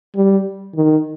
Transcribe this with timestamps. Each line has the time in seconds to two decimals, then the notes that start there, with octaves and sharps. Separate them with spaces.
0.15 G3
0.75 D#3